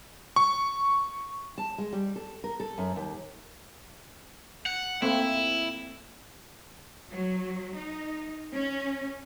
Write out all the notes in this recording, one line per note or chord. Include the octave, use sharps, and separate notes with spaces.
C#6
A5
G#3
G3
A4
A#4
A4
F#2
D#2
F#5
A3 A#3 C4 E4
F#3
D#4
C#4